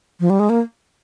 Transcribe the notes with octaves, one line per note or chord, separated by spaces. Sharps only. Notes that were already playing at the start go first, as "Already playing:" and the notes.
F3
G3
G#3
A#3